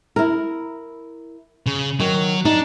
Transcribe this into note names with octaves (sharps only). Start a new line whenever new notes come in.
E4 A#4
C#3
D#3 F#3
D4 D#4